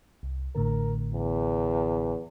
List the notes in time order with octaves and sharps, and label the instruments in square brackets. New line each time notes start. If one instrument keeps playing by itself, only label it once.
[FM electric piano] C2
[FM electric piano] A1 A2 D3 [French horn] A#4
[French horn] E2